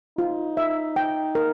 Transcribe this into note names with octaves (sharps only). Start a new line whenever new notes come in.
D#4 F4
E5
G5
A#4